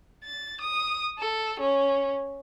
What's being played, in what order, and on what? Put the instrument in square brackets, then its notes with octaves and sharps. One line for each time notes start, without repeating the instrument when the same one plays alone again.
[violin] A6
D#6
A4
C#4